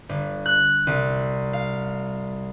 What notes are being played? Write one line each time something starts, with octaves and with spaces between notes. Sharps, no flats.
G1
F#6
C2
F5